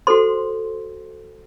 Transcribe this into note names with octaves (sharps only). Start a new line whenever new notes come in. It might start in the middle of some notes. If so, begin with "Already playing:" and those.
F#4 A4 C5 C6